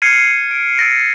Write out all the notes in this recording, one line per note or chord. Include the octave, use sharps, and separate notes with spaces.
F6 G#6 C7 C#7 D#7
D7
E6 A6 A#6 D7